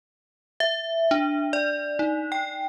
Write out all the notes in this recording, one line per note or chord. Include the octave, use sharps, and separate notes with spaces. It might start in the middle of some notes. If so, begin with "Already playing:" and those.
E5
D4
D5
D#4
G5